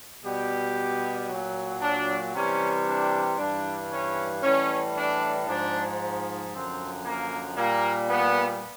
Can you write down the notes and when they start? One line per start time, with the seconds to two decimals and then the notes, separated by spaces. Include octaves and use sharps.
0.24 B2 G3 G4
1.29 A#2 F#3
1.81 D4
2.34 C3 E3 G3 C#4
2.86 D4
3.38 G2 E3 G3 D4
3.91 C#4
4.43 A2 E3 G3 C#4
4.96 D4
5.48 G#2 F3 D4
6.52 F#2 D3 F3 C4
7.04 A#3
7.57 A#2 G3 A#3
8.09 B3